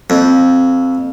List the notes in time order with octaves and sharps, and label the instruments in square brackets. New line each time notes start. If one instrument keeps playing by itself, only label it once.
[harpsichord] F2